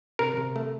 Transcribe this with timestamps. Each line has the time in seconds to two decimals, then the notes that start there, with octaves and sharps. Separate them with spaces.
0.19 C3 A#4
0.37 C3
0.56 A3